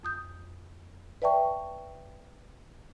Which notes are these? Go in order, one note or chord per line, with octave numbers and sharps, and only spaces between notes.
F2 D#6 G6
B4 D5 E5 G5 A5 C#6